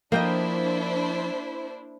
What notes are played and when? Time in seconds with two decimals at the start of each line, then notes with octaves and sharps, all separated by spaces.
0.12 F3 A#3 D4 E4 A#4 C5 D#5 G5